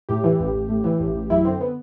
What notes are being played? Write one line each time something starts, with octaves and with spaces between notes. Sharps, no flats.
A2 G4
E3
A1
A1
A2
E3
A1
A1
F#2 E4
D3 C4
B3